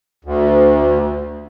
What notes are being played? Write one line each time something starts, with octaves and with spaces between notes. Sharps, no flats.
D2